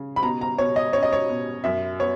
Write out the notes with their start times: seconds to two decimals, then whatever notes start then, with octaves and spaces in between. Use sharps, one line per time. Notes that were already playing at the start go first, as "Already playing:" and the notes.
Already playing: C#3
0.16 B5
0.23 B2 A#5
0.41 A#5
0.58 B2 C#5
0.76 D#5
0.93 C#4 C#5
1.03 D#5
1.13 C#5
1.29 B2
1.64 F#2 E5
2.00 B3 C#5